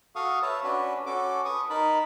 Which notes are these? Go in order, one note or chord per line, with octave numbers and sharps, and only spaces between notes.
F#4 A4 F5 C#6 D#6
B4 C#5 E5 A5
C#4 D4 F#4 B4
C#4 F#4 A4 D6
B4 C#6 D#6
D#4 A#4 A5 B5